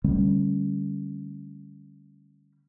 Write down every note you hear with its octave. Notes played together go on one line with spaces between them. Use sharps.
D3 G3 A3 C#4